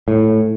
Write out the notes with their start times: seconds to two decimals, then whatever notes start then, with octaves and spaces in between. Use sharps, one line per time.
0.08 A2